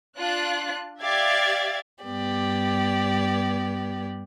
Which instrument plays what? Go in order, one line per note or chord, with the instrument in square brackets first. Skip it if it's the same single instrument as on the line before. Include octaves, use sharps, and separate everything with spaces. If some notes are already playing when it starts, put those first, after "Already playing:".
[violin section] D4 F4 F#6
G4 D5 E5 F5 G#6 A6
[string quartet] G2 B3 G4 D5